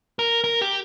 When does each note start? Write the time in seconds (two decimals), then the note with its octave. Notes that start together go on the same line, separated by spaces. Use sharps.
0.19 A#4
0.44 A#4
0.61 G4